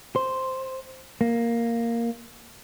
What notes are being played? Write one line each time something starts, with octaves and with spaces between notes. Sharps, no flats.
C5
A#3